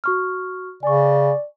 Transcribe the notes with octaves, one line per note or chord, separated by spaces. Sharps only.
F#4 C#6 F6
C#3 D5 G#5 C#6